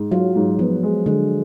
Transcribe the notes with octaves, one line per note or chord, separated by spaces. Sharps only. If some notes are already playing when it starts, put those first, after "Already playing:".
Already playing: G#2
F#3 F4
G#2
F3 B3
G#3
D3 G#3